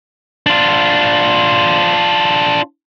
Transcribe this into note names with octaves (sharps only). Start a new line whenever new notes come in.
D4 F4